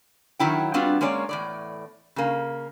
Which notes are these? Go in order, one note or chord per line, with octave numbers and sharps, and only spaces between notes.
D#3 F#3 E4 G5
G3 B3 C4 D4 F4 F#4
G#3 A#3 C#4 C#5 D5
E2 A2 D5
C#3 A#3